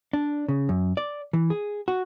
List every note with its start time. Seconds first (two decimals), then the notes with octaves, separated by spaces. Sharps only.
0.13 D4
0.49 C#3
0.69 F#2
0.97 D5
1.33 E3
1.50 G#4
1.88 F#4